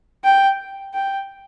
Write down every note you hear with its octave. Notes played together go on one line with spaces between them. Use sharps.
G5
G5